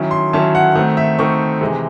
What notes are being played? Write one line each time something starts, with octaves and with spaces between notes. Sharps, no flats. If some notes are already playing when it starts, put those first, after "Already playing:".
Already playing: D#3 F#3 C#4 E4
C6
D#3 F#3 C#4 E4 A5
F#5
D#3 A3 C4 F#5
E5
D#3 A3 C4 C#6
C3 E3 G#3